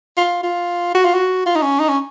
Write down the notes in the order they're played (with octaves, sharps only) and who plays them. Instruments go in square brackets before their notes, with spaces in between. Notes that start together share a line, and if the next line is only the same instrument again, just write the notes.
[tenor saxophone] F4
F4
F#4
F4
F#4
F4
D#4
C#4
D#4
C#4